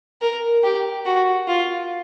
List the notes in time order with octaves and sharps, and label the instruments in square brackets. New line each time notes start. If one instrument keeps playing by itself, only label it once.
[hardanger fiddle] A#4
G4
F#4
F4